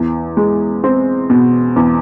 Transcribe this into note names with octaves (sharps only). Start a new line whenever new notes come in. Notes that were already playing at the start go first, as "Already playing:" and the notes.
Already playing: E2
G#3
C4
B2
E2